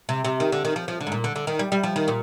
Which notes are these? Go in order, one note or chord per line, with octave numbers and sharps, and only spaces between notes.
C3
C3
D#3
D3
D#3
F3
F3
D3
G#2
A#2
D3
D3
D#3
G3
G3
F3
D#3
A#2